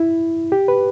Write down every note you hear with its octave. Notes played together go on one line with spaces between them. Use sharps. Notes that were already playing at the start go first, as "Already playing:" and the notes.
Already playing: E4
G4
B4